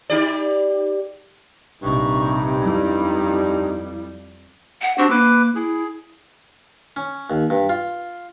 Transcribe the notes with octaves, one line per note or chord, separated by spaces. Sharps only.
D#4 G4 D5
A#1 G2 C3 D#4 C#6
F2 G3 E4
F#5
C4 D4 F#4 G4
A#3 B4 D6
E4 G#4
C#4
D#2
G2
F4